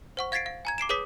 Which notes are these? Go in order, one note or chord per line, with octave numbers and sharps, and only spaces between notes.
C5 F#5 C#6
F5 G#6 A6 B6 C7 D7
F5
G#5 A#5 G#6
D6 C7 D7 E7
G#4 B4 C#5 D6 D#6 B6